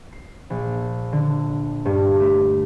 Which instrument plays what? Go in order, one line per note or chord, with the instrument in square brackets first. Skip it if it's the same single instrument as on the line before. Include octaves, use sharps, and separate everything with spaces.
[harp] C7
A#1
D3
G2
A3